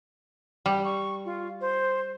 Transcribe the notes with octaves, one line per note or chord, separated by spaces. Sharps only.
G3
C#6
F4
C5